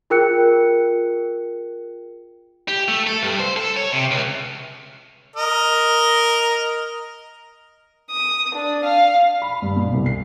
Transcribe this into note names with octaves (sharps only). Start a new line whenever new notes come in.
F4 G#4 A#4 G5 F#6 C#7
G4
A3
A4
G2
C5
A4
C#5
C3
C#2
A#4 D#5
D#6
D4
F5
B5
G2
B2
C2
C7